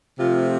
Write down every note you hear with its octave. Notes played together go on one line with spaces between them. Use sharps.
C3 F3 A3 F4